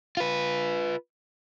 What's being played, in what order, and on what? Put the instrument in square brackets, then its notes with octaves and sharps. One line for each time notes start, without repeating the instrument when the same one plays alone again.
[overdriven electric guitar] F4 B4